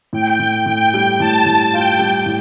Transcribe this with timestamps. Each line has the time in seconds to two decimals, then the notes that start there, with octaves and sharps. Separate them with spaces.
0.13 A2 G5
0.39 A2
0.66 A2 G5
0.94 G3
1.20 A2 A5
1.46 A2
1.73 F4 G5
1.99 G3
2.26 A2